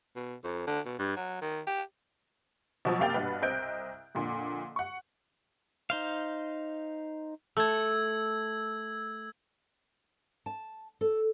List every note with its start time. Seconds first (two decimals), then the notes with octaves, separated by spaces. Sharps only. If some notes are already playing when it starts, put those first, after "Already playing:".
0.16 B2
0.44 F2
0.67 D3
0.86 B2
0.99 G2
1.16 F#3
1.42 D#3
1.67 G4
2.85 B2 F3 F#3
2.99 F#2 C3 A#3 F5 G5 A6
3.14 G2 B2 B4
3.42 C2 C4 D#5 F#6 G6 D7
4.15 F2 A#2 D3
4.76 F#5 C#6
5.90 D#4 C5 F5
7.57 A3 E6 G#6
10.46 A5
11.01 A4